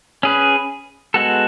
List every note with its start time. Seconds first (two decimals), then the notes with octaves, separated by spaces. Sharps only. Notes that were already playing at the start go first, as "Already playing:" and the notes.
0.23 C#4 G#4 B4
1.14 G#3 B3 F#4 A4